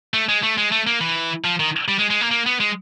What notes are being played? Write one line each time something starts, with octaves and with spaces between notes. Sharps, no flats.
A3
G#3
A3
G#3
A3
A#3
E3
F3
D#3
G3
G#3
G#3
A#3
A#3
B3
G#3